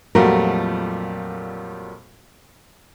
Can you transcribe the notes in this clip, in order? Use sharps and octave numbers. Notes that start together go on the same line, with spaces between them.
F2 A#2 F#3 G3 A3 F4 F#4 A#4